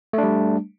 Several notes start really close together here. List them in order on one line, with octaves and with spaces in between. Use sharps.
A3 D4 G3